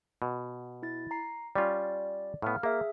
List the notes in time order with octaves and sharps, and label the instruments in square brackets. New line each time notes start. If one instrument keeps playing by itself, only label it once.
[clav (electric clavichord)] B2
[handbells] E4 A6
A#5 C7
[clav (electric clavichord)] G3 C#4 F4 [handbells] D5
[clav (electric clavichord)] A2 B3 [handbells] F5 F6
[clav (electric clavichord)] A#3 [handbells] G#4 E5